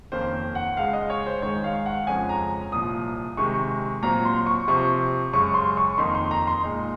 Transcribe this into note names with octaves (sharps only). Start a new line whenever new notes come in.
F2 D#3 A#3 C#4 C5
F#5
C#2 C#3 G#3 F5
D#5
C#5
C5
G#2 D#3 G#3 D#4 C#5
F5
F#5
F2 C#3 F3 G#3 C#4 G#5
A#5
C2 A#2 F3 D#6
C3 D#3 G#3 C#6
A#2 F#3 C4 A#5
C6
C#6
C3 F3 C4 C#6
F#2 C#3 G#3 C#6
C6
C#6
F2 D#3 A#3 D#4 C6
C6
A#5
C6
A#2 G#3 D#4